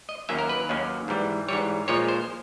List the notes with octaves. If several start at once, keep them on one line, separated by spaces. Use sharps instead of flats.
D#5
D#2 D#3 F#3 A#3 C#4 E5
A#4
B4
D#2 D#3 F#3 A#3 C#4
G#2 E3 G3
G#2 E3 G3 C#5
A#2 F3 G#3 C#5
C5